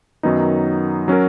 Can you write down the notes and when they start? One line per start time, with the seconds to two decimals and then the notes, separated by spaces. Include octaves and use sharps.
0.23 F#2 D#3 F#3 B3 D#4
1.08 F#3 C#4 F#4 A#4